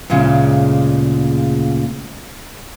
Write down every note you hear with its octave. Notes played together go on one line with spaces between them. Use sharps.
D2 A#2 C#3 G#3